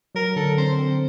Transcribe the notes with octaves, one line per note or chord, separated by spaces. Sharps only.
F#3 A#4
D3 A4
C4 C5
C4